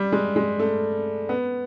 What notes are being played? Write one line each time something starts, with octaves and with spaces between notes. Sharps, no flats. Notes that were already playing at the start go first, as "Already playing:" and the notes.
Already playing: G3
G#3
G#3
A3
B3